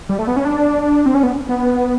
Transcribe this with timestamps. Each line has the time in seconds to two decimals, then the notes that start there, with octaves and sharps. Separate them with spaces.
0.09 G3
0.19 A3
0.27 B3
0.36 C#4
0.45 D4
1.06 C4
1.15 C#4
1.23 B3
1.49 B3